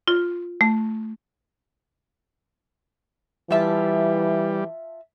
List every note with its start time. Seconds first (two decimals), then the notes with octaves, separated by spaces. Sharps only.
0.08 F4
0.61 A3
3.51 E3 G3 F4 E5 A5